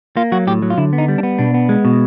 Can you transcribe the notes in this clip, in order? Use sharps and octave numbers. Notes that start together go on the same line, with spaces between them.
A#3 F4
F#3 F#4
A2 G4
F#3
F4
D3 E4
B3
D#4
G3
D4
B3
B2 D4
B3
G#3
B2